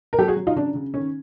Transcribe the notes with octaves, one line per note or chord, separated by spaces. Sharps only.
A#4
F#3 G4 A4
F#4 G#4
F#3
D#4 F4
C#3 D4
C#3
D#3 C#4